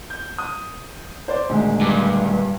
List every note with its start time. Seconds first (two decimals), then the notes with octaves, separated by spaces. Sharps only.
0.10 G6
0.38 D#6
1.28 C5 D5
1.49 D#1 D2 G#3
1.81 G2